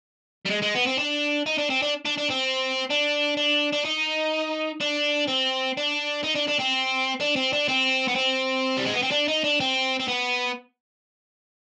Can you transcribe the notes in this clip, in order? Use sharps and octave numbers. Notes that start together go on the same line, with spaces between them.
G3
G#3
G#3
B3
C4
D4
D#4
D4
C4
D4
D4
D4
C4
D4
D4
D4
D#4
D4
C4
D4
D#4
D4
D4
C4
D4
C4
D4
C4
B3
C4
G3
G#3
B3
C4
D4
D#4
D4
C4
C4
B3